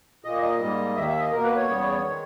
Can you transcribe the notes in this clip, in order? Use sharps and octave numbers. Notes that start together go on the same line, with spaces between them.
A#2 A#3 D#5
D#5
G#2 G3 A#3
D#2 D#3 A#3 E5
E5
D#5
B2 A#3 A#4
B4
C#5
E2 C#3 G3 B3
D#3 G#3